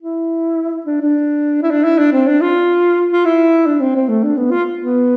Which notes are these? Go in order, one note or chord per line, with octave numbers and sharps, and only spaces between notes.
E4
D4
D4
E4
D4
E4
D4
C4
D4
F4
F4
E4
D4
C4
C4
A3
D4
B3
F4
B3